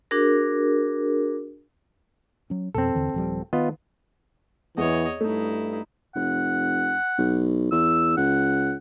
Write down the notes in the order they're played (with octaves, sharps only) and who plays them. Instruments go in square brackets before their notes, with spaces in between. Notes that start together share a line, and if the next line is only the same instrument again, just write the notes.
[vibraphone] D4 F#4 G#4 A#4
[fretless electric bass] F#3 C#4
[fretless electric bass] F2 B2 [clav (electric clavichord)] C4 A4
[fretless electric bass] E2 D3 E3
D#1 F3 G3
[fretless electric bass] D#3 [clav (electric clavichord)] B3 F4 D#5
[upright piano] E2 [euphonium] E3 [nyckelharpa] C#5 D#5
[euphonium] G2 [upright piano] A3 [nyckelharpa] D#4 E4
[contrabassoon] F1 [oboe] F#5
[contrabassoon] B1
[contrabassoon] E2 [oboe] E6
[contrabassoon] C#2 [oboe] F#5